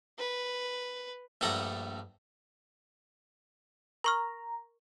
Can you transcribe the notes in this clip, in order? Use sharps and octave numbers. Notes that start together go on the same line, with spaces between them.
B4
A#1 G2 A3 A4 F#5 A#5
A#4 A#5 C#6 F6